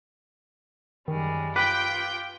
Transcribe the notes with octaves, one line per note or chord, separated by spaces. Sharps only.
F#2 D#3 G3 G#3
F4 B4 G5 D6